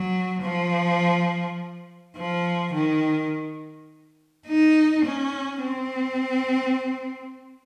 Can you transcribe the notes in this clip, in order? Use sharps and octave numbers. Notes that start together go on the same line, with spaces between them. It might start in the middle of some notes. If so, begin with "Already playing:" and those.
Already playing: F#3
F3
F3
D#3
D#4
C#4
C4